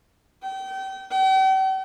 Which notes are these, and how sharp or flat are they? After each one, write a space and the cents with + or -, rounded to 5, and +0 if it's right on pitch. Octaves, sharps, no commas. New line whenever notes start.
G5 -30
G5 -45